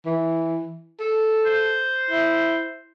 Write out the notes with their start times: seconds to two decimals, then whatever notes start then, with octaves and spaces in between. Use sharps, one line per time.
0.06 E3
1.00 A4
1.46 C5
2.11 E4